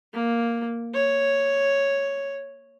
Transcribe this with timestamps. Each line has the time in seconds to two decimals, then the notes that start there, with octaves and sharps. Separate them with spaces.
0.13 A#3
0.94 C#5